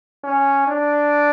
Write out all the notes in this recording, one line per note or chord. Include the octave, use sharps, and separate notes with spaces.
C#4
D4